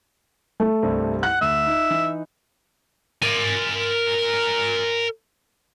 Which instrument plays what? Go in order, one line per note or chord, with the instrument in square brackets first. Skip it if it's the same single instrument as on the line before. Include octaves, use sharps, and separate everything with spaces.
[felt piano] A3
[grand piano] C2 G2 C4
[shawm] F#5 [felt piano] F#6
[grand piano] D2 [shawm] E5
[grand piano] D#4
E3 D#4
[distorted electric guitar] A#4 G#5